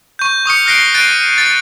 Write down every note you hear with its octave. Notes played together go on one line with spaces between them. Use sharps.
C#6 G6
C#6 D#6 F6 C#7
F6 F#6 A#6 C7 D7 G7
F#6 A6 C7 D7 D#7
D#7
A6